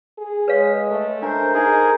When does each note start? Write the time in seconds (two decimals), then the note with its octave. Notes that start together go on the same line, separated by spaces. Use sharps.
0.18 G#4
0.48 G#3 B4 C#5 F5
0.91 A3
1.22 D4 A#4 C5
1.54 D#4 G#4 A#4